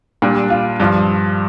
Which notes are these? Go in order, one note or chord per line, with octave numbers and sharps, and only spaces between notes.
A#2 G3 D4
F4
G2 F3